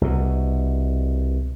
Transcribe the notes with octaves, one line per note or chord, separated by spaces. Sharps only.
C2 B2